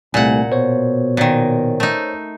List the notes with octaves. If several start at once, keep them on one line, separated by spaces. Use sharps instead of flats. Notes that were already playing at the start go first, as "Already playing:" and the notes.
C2 A#2 A3 F#5 G#5
B2 C5 C#5
A#2 D#3
A3 D#4